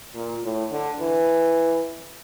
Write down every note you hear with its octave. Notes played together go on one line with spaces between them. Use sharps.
A#2
A2
D3
E3